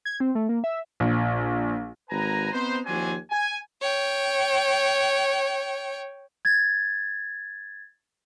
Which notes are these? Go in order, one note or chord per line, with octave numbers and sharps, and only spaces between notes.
G#6
C4
A3
A#3
E5
A#1
G#1 B4 G#5 A#5
B3 C4 D#4 B4 C5
D#2 F3 C4 D4 F#4 G#5
G#5
C#5 G5
G#6 A6